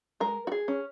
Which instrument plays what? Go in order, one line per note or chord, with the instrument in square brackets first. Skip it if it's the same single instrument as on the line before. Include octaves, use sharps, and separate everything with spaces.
[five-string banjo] G#3 A#4
F#4
G#4
C#4